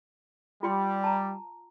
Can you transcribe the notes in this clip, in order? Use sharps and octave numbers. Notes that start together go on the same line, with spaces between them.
G3 F4 G5 C6
A5 A#5